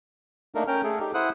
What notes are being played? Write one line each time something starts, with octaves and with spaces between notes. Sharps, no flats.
A3 A#3 D4 D#4 A#4
C#4 A#4 G5 F6
A3 G#4 A4
D#4 G4
E4 C5 F#5 D#6 F#6